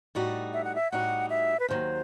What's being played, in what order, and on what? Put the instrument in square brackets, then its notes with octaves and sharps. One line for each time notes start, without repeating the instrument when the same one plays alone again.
[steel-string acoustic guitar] A2 G3 D#4 F#4
[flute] E5
F#5
E5
[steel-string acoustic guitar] A2 G3 D#4 F#4 [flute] F#5
[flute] E5
B4
[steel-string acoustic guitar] D#2 D#3 F#3 [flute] C5